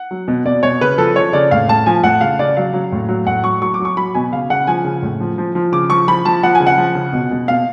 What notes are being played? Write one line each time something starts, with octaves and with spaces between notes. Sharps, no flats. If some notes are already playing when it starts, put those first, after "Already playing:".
Already playing: F#5
F#3
B2
B2 D5
B2 C#5
C#3 B4
F3 A4
F3 C#5
C#3 D5
A2 F5
A2 A5
F3 G#5
A2 F#5
C#3 F5
C#3 D5
F#3 F5
F#3
A2
F#3
A2 F#5
F#3 C#6
F#3 C#6
D6
F#3
C#6
F#3 B5
B2 G#5
C#3 F5
C#3 F#5
F3 G#5
C#3
A2
F3
F3
F3
C#3 D6
F3 C#6
F3 B5
F3 A5
F3 F#5
G#5
C#3
F#5
F3
C#3
B2
B2
B2 F5